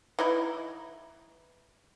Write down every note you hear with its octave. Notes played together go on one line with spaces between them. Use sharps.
E3 D#4 E4